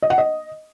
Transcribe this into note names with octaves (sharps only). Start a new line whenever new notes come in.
D#5
F#5
D#5